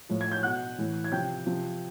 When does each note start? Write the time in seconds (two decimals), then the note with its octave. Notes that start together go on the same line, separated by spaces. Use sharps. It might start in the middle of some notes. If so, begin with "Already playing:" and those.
0.09 A2 F3
0.21 G#6
0.32 G6
0.43 B2 F#5 F#6
0.78 A2 E3
1.04 G#6
1.12 C3 F3 G5 G6
1.46 C3 F3